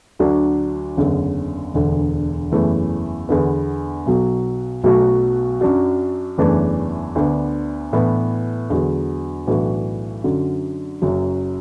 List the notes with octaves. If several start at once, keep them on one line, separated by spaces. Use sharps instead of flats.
D2 D3 F#3 D4 F#4
F#1 E2 D3
E1 D2 D3
F#1 E2 E3 A3 E4
E2 D3 B3
B1 B2 F#3
B1 B2 F#3 A3 F#4
F#2 F#3 D4 F#4
F#1 E2 E3 A3 D4
D2 D3 B3 D4
A2 E3 B3 D4
E2 D3 F#3
B1 A2 E3 D4 F#4
F#2 D3 F#3
F#1 F#2 F#3